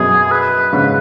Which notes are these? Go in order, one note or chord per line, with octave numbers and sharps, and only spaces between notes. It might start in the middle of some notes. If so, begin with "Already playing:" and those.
Already playing: F#2 B2 G#4
B4
G#2 C#3